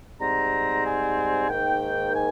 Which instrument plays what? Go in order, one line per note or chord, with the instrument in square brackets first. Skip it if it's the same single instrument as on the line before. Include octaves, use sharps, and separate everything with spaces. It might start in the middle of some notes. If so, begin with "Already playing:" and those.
[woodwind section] G#2 G3 C4 A#5
G#5
G#2 D#3 A#3 G5
G#5